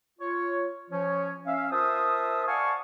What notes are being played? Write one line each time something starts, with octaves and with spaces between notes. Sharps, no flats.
F4 C#5
F3 C#4 C#5
C#4 E5 F5
F4 A#4 C5 E5 A5 D#6
D5 F5 F#5 G#5 A5 C#6